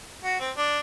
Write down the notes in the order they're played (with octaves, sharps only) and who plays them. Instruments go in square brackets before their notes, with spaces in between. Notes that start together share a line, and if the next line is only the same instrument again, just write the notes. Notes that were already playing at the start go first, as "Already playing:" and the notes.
[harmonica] F#4
C4
D4